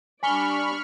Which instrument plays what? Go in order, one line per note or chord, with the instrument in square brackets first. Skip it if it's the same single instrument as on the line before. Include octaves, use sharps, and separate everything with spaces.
[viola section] G3 D4 D5 [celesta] G#5 G7 [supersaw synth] B5 C#6 F6